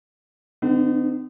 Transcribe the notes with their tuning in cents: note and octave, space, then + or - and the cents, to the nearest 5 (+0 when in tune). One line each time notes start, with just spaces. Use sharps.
D3 +10 C4 -45 D#4 -25